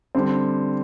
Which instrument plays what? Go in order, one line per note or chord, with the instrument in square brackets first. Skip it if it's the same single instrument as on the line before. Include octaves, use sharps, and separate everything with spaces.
[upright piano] D3 G3 C4